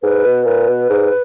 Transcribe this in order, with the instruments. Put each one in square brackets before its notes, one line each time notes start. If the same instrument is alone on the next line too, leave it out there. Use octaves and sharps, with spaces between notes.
[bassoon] G#2 [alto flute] B4
[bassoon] B2
[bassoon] A#2 [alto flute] B4
[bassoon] B2
G#2